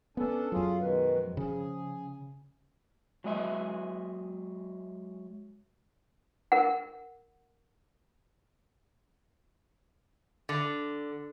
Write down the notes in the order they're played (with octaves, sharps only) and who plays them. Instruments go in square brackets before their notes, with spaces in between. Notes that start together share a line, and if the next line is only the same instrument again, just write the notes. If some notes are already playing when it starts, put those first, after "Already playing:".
[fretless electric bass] B3 [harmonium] C#4 D4 [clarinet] A4
[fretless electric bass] F#2 F#3 [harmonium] C#4 F4 G#4
[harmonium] B2 D#3 G#3 [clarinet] B4
[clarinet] F3
[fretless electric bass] C#3 [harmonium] G#4
[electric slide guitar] F#3 G#3 D#5 E5
[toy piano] A#4 F#5
[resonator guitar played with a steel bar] D3